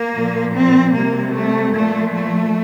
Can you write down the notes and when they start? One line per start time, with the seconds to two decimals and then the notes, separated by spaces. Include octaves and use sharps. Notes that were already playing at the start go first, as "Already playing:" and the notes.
Already playing: A#3
0.13 A#2 F3
0.54 C4
0.93 C3 G3 A#3
1.34 A3
1.75 A#2 F3 A3
2.15 A3